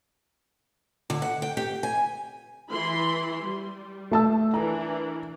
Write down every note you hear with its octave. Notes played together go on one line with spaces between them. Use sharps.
D3
F#5
G5
G4
G#5
E3 B5 C6
G3
A3 A5 E6
E3 D4 A#4 A#5